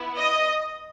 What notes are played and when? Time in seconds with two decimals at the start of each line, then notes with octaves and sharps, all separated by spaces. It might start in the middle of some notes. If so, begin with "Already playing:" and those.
Already playing: B3 E4
0.16 D#5